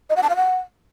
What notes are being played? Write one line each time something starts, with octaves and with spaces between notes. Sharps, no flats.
D#5
F#5
A5
F5
F#5